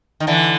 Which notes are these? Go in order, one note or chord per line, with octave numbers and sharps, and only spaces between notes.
D#3
D3 E3